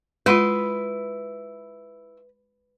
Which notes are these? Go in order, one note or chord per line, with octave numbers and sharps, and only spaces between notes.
G#3 E4 F4 B4 C6 D#6